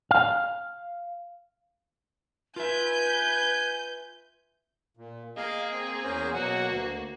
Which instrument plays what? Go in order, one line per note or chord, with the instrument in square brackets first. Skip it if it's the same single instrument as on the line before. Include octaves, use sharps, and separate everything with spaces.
[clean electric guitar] F5
[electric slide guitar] F4 E5 [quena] B4 [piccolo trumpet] G#5 [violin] G6
[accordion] A#2
[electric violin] A#3 G#4 [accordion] D#5 F5
[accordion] C4
E2 C#4 C5
[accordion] B2 F#3 F#5 [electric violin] A#3 F#4
[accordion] D2